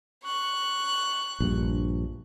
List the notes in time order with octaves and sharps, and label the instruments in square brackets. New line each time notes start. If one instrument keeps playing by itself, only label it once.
[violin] C#6 F#6
[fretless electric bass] A#1 G2